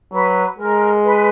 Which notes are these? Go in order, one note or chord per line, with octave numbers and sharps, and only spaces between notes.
F#3 B4
G#3 A#4
B4